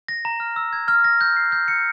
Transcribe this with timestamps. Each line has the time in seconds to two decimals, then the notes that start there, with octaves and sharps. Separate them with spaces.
0.08 A#6
0.25 A#5
0.40 F6
0.56 E6
0.73 G#6
0.88 F6
1.04 A#6
1.21 G6
1.37 C7
1.52 G6
1.68 C#7